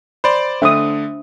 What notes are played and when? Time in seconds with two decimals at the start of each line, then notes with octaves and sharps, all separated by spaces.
0.24 C5 D5 B5 C6
0.62 D3 A3 D4 C5 E5 D#6 E6